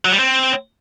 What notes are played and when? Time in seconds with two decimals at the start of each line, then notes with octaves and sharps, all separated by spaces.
0.05 F#3
0.12 G3
0.19 C4